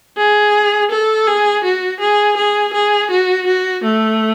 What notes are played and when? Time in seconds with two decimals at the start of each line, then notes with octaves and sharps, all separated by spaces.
0.17 G#4
0.91 A4
1.27 G#4
1.64 F#4
2.01 G#4
2.37 G#4
2.73 G#4
3.11 F#4
3.47 F#4
3.84 A3